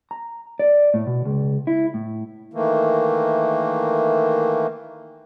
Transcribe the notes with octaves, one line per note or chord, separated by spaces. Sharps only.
A#5
D5
A2
B2
C#2
E4
A2
D#3 E3 A3 A#3